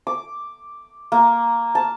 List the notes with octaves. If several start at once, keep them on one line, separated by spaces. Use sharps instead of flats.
D6
A#3
A5